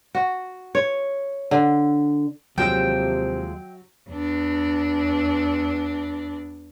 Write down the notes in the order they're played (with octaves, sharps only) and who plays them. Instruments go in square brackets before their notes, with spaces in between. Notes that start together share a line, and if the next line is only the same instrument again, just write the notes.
[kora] F#4
C#5
D3
[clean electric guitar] D#2 F3 G#3 [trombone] C3 [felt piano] F#3 [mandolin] E5 G5
[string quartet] E2 D4